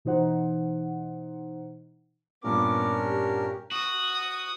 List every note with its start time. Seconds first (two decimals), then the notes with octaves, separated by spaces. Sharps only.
0.05 B2 E3 D#4 C5 F#5
2.44 G2 A#2 B3 C#4 D4 A#4 D6
3.01 G4
3.72 F#4 D#6